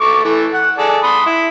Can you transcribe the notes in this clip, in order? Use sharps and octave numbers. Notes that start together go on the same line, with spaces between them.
A3 C#6 D6
E3 A3
F#5
G#4 A4 D5
B5 C6 D#6
E4